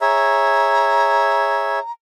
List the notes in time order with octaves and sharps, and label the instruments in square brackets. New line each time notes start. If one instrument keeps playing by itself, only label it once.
[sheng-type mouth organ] G#4 C#5 E5 [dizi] A#5